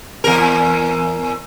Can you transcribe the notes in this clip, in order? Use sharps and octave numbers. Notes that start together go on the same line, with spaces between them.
E2 A#4